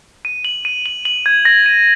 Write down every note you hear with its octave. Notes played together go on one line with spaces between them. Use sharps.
D#7
F#7
D#7
F#7
F#7
G#6
A#6
D#7